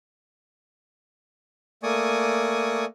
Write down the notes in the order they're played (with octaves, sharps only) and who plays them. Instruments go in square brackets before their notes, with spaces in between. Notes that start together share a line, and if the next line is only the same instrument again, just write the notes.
[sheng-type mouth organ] A3 A#3 D5 G#5 C#6 D#6